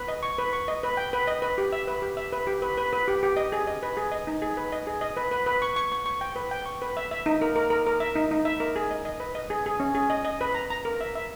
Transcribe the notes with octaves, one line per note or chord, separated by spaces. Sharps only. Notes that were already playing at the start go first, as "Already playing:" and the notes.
Already playing: B4
D#5
C#6
B4
C#6
D#5
B4
G5
B4
D#5
B4
G4
E5
B4
G4
E5
B4
G4
B4
B4
B4
G4
G4
D#5
G#4
D#5
B4
G#4
D#5
D#4
G#4
B4
D#5
G#4
D#5
B4
B4
B4
C#6
C#6
C#6
C#6
G5
B4
G5
C#6
B4
E5
E5
D#4
A#4
A#4
A#4
A#4
E5
D#4
D#4
E5
A#4
G#4
D#5
D#5
B4
D#5
G#4
G#4
C#4
G#4
D#5
D#5
B4
A#5
A#5
A#4
E5
E5